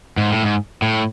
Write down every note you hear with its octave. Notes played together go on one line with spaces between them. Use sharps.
G#2
A2
G#2
A2